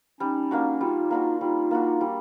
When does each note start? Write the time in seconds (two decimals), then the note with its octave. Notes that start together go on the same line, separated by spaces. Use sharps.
0.20 G3 C#4 D#4
0.51 A#3 D4 F#4
0.80 G3 D#4 F4
1.11 A#3 D4 F#4
1.41 G3 D#4 F4
1.71 A#3 D4 F#4
2.01 G3